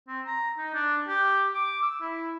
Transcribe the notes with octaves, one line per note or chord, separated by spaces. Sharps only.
C4
A#5
D#4
D4
G4
D6
E6
E4